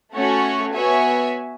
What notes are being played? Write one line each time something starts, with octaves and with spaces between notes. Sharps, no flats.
A3 C#4 F#4 C#5
B3 F#4 C#5 E5 G#5